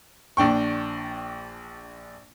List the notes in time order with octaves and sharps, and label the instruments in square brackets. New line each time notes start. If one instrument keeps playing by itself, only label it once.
[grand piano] A#1 D4 G5 C#6